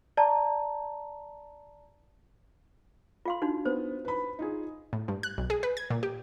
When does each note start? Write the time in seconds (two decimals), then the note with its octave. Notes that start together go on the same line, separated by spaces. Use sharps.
0.17 D5 A5 A#5
3.26 F4 F5 C6
3.42 D4 D#4 F#4
3.65 B3 C5
4.05 B4 B5
4.39 D#4 F4 G#4
4.93 A2
5.08 G2
5.23 F#6
5.38 B1
5.50 G#4
5.63 B4
5.77 G#6
5.90 A#2
6.03 G4